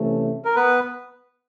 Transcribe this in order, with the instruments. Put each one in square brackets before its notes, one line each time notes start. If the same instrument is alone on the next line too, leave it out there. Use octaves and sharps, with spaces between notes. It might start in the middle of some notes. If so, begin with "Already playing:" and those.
Already playing: [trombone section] C3 E3 A3 C#4
[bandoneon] A#4
B3 B4